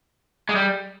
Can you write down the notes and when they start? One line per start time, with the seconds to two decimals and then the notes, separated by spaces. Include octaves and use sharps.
0.49 G#3
0.55 G3